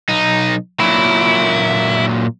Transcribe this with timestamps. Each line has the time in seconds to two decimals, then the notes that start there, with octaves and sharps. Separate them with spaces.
0.09 B1 D#4
0.80 A#2 F#3 E4